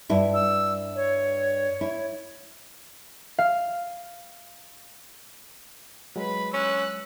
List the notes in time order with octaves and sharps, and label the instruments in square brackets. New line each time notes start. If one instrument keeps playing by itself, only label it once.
[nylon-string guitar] G2 E4 E5
[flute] E6
C#5
[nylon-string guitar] E4
[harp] F5
[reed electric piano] F#3 G#3 [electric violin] B4 B5
[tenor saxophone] C#4 [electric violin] E6 F#6